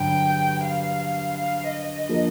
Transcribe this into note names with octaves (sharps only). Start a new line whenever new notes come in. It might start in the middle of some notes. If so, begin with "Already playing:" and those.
Already playing: G2 D3 F#3 D4 G5
F5
F5
D#5
F3 A#3 D4